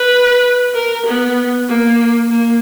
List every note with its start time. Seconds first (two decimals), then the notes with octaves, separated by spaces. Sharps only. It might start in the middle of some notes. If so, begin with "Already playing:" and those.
Already playing: B4
0.75 A#4
1.06 B3
1.69 A#3
2.30 A#3